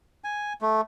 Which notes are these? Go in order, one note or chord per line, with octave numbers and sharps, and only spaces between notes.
G#5
A3